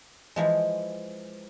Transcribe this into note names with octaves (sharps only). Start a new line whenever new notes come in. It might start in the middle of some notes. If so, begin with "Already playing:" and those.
E3 F3 G#3